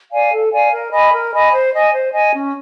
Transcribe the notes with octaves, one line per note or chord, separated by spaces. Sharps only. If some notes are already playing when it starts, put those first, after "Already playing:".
D5 F5 G#5
A4
D5 F5 G#5
A#4
D#5 G#5 B5
A#4
D#5 G#5 B5
C5
D#5 G#5
C5
D#5 G#5
C#4